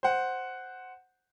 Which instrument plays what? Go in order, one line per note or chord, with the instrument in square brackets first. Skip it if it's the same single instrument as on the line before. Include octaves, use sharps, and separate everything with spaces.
[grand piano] C5 F#5